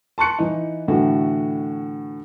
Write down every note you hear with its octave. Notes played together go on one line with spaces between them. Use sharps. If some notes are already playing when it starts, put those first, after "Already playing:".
A5 C6 C#6 F#6 C#7
E3 D#4
A2 D3 E3 F#4